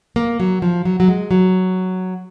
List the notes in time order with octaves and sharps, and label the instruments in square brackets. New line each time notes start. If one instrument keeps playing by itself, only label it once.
[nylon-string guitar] A#3
F#3
F3
F#3
F#3
G#3
F#3